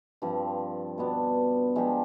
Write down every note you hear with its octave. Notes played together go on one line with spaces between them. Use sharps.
G2 F3 C4
B2 B3 D4
F3 G#3 D4 G4